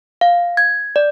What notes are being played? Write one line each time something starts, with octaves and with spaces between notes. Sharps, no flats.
F5
G#6
D5